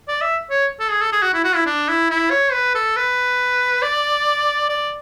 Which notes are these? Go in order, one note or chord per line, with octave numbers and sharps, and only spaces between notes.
D5
E5
C#5
A4
G#4
A4
G#4
F#4
E4
F#4
E4
D4
E4
E4
C#5
B4
A4
B4
D5
D5